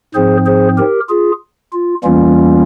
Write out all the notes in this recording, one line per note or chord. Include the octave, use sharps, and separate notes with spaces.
G#2 F3 C4 G#4 C5
G#4 C5
G4 A#4
F4 G#4
F4
E2 E3 G3 A#3 C#4 F4